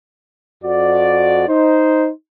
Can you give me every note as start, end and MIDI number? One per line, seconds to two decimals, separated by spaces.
0.64 1.44 41
0.64 1.44 66
0.64 1.44 74
1.48 2.09 63
1.48 2.09 72